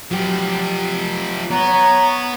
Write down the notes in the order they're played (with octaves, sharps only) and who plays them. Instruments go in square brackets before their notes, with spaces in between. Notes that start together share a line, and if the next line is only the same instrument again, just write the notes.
[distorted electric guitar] F3 G4 [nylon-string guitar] F#3
[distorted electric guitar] B3 [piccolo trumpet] C#5 [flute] A#5